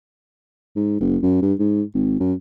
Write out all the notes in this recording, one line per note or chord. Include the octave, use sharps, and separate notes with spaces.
G#2
F#1
F#2
G2
G#2
G#1
F#2